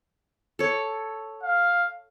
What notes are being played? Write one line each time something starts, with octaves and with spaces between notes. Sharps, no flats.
A4 C#5
F5